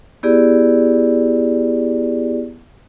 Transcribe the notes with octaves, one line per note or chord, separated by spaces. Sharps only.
B3 E4 G4 G#4 D5